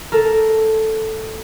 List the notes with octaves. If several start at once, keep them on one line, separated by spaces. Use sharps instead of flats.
A4 A#4